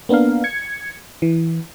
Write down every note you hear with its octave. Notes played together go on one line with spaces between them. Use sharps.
A#3 B3 D4 A#4 F5
G#6 C#7
E3